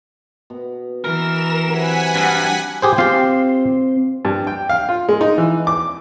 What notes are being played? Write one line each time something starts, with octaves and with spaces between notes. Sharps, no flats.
B2
E3 A#4 E7
C3 F#3 B4 F#5 G#5 B6
G2
G4 G#4 C5
C4 F4 G4 C6
G2
G5
F5
F4
G#3
D#4
E3
D6